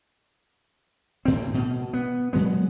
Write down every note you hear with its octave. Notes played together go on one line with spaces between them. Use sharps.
D2 A2 C4
B2
B3
A#2 F#3 G#3 B3